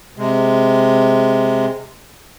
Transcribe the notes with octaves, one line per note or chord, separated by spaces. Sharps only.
C3 G#3